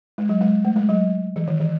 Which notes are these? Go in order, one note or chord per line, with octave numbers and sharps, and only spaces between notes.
G#3
F#3
G#3
A3
G#3
F#3
E3
D#3
E3